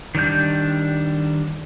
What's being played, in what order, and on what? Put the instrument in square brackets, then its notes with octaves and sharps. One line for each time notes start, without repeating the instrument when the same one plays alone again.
[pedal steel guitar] D#3 G3 D4 G6